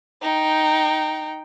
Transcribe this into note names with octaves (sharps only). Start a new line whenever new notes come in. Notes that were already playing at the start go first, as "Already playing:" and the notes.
D#4 G5